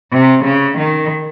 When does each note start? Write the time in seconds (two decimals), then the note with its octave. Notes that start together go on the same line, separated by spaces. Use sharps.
0.12 C3
0.44 C#3
0.78 D#3